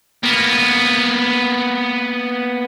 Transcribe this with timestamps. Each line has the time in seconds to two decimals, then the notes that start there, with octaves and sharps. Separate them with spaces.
0.23 A#3 B3